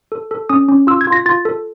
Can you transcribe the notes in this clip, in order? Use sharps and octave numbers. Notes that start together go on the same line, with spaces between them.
A4
A4
C#4 D#6
C#4
F4 E6
G#6
F4
A#6
F4 A6
A4